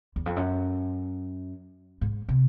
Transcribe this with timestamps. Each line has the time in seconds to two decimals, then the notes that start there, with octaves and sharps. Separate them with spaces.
0.16 E2
0.26 F2
0.36 F#2
2.01 G#2
2.28 C3